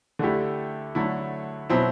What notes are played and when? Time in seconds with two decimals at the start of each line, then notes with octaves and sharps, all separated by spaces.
0.19 D3 A3 E4 G4
0.95 D3 F#3 A3 E4
1.70 B2 F#3 C4 E4